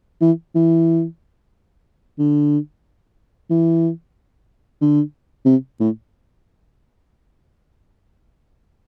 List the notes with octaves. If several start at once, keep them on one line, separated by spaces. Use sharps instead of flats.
E3
E3
D3
E3
D3
C3
A2